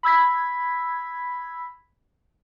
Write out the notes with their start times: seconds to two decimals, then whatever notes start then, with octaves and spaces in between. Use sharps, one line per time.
0.03 B5 E6 G#6 B6